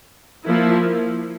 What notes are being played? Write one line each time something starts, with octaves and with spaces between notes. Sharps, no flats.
F3 A#3 E4